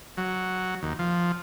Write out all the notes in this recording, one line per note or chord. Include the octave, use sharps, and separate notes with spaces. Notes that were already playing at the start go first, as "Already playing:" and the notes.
F#3
D#2
F3